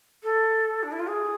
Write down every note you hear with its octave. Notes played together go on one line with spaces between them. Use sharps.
A4
D4
E4
F4
G#4